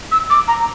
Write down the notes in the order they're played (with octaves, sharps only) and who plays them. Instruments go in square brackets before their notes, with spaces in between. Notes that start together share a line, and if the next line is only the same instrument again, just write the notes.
[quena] E6
D6
A#5